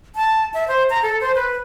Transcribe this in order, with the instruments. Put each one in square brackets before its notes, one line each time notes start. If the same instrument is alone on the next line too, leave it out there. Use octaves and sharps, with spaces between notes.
[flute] A5
E5
C5
A#5
A4
C5
B4